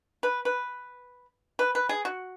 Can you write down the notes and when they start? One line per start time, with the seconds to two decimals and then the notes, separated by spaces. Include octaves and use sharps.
0.23 B4
0.45 B4
1.59 B4
1.75 B4
1.89 G#4
2.05 F#4